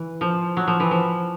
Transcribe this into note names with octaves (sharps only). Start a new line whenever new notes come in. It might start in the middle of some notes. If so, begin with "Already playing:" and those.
Already playing: E3
F3
F#3
F3
E3
F3